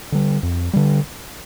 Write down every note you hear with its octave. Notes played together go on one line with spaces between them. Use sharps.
D3 G3
F2
D3 G3